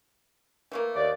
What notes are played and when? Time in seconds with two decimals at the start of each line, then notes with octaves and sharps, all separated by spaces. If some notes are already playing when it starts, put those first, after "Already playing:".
0.72 E3 A3 A#3
0.95 D#2 D5